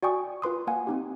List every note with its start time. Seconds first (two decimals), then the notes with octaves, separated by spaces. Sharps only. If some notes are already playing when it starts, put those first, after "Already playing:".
0.03 F#4 D5 G5 G#5 C#6 D#6
0.42 F4 B4 C6 D#6
0.67 A#3 F5 F#5 G#5
0.87 C4 D#4 G4